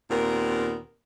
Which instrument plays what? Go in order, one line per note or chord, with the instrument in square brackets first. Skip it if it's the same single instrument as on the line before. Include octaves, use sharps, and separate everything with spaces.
[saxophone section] D#2 A#2 B3 C4 A#4